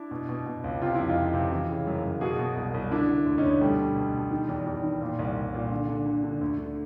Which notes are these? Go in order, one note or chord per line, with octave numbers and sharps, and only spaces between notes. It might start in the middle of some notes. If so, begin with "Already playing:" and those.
Already playing: D4 E4
B2
B2
B2
C#2
C3 F4
F2 E4
D#4 F4
F2
C3
E3
C#3
F#2
F#2
B2 F#4 G#4
B2
C2
C2
D3 D4 E4
D3
D2
C#4 D#4
D2
B2 G3 A3
B2
B2
B2
D#3
E2
E2
D#3
A#2
C2
C2
A#2
D3
D3
D3
D3
D2
D3